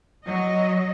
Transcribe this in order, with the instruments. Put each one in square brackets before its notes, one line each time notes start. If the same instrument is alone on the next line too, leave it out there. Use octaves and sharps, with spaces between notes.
[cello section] F#3 D#5